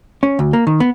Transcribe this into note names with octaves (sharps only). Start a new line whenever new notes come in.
C#4
D2
A#3
D#3
B3